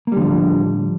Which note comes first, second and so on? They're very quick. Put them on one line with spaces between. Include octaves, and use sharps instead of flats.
A#3 G3 D3 F3 A2